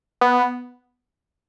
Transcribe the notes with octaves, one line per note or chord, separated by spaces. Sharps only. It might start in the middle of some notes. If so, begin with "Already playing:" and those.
B3